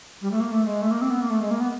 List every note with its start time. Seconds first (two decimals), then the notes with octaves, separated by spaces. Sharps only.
0.22 G3
0.31 A3
0.40 A#3
0.51 A3
0.66 G#3
0.81 A3
0.91 A#3
1.01 C4
1.10 B3
1.21 A#3
1.30 A3
1.41 G#3
1.51 A#3
1.60 B3